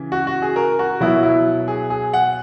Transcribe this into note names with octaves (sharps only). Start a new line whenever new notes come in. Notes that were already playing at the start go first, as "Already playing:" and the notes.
Already playing: C#3 E3
F#4
F#4
G#4
A#4
F#4
B2 F#3 E4
E4
G#4
G#4
F#5